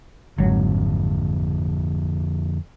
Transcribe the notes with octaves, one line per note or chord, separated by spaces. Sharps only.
G#1 F2 D3 F#3